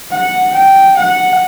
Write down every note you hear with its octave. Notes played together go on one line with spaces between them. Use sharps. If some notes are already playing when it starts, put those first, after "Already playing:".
F#5
G5
F#5